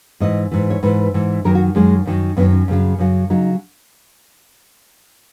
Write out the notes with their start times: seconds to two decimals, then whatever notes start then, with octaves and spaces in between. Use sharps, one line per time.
0.20 G#2 E3 D#5
0.52 G#2 E3
0.70 C#5
0.83 G#2 E3 B4
1.14 G#2 E3
1.44 F#2 D#3 F#3 A#4
1.55 F#4
1.75 F#2 D#3 F#3 G#3
2.06 F#2 D#3 F#3
2.37 F#2 D#3 F#3 B3
2.52 C#4
2.68 F#2 C#3 F#3
2.98 F#2 C#3 F#3
3.30 C#3 F#3 D#4